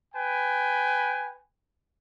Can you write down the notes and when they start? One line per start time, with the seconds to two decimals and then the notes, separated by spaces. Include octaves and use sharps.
0.15 B4 G5 G#5